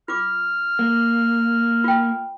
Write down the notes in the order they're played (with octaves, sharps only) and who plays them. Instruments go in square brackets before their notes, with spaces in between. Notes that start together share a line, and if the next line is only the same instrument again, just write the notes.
[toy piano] F4 D6 [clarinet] F6
[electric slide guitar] A#3
[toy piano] F4 G5